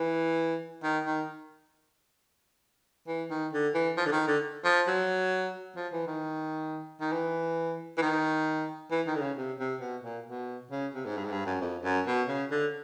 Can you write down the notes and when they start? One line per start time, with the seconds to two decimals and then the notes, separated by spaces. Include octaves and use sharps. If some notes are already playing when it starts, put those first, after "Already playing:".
Already playing: E3
0.83 D#3
1.05 D#3
3.07 E3
3.31 D#3
3.53 D3
3.74 E3
3.97 F3
4.06 D3
4.12 D#3
4.28 D3
4.65 F3
4.87 F#3
5.76 F3
5.93 E3
6.07 D#3
7.01 D#3
7.12 E3
7.97 E3
8.02 D#3
8.91 E3
9.07 D#3
9.15 D3
9.21 C#3
9.37 C3
9.60 C3
9.81 B2
10.04 A#2
10.26 B2
10.71 C#3
10.94 C3
11.05 G#2
11.17 G2
11.25 G#2
11.32 G2
11.46 F#2
11.61 F2
11.84 F#2
12.07 B2
12.28 C#3
12.51 D3